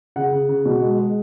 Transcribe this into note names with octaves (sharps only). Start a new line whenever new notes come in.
C#3 F#5
C#3
C#3
B2
G#3
G#3